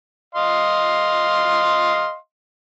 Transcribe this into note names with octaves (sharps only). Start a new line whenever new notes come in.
D#5 F5 C6